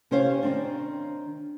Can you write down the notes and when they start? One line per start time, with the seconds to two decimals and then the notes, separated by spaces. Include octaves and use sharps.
0.11 C3 C#4 E4 C5 C#5 F5
0.42 D#3 C4 D4